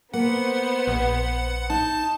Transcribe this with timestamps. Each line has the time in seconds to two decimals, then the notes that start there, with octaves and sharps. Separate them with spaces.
0.14 A#3 B3 C5 F#5
0.88 A#1
1.70 D#4 A5